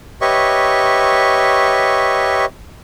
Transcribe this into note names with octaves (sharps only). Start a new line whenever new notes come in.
G4 B4 C#5 D#5 E5 C#6